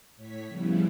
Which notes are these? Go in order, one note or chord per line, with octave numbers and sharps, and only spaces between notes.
A2 C#5 B6
C#3 F3 G3 B3 E4